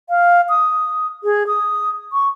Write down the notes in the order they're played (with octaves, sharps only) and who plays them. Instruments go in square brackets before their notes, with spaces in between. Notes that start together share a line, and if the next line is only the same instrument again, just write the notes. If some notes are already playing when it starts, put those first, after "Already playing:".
[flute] F5
D#6
G#4
D#6
C#6